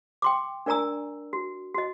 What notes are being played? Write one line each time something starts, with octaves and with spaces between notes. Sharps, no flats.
G5 C6 D6
D4 A#4 D5 G#5 A#5 E6
F#4
F#4 D#5